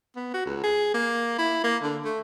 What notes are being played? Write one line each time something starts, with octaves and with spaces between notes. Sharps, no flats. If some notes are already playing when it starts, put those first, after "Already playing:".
B3
F#4
C#2
G#4
A#3
E4
A#3
D3
A3